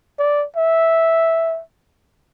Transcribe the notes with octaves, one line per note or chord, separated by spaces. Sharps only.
D5
E5